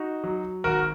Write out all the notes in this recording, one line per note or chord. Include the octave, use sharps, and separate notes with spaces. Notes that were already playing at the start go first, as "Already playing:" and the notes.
Already playing: D#4 F#4
F#3
G#1 F#4 A#4